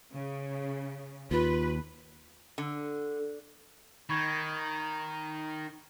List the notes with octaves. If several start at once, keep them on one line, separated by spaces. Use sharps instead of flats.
C#3
D#2 F4 B4
D3
D#3 B5 C#6 G#6